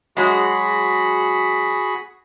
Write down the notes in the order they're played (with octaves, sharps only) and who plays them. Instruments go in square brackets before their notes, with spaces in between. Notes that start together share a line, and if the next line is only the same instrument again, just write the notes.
[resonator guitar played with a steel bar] F#3 G#3 [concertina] F#4 G#4 B5